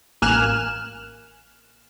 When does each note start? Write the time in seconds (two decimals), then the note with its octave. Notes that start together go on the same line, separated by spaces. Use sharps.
0.22 A1 A#3 G#5 F6 F#6 E7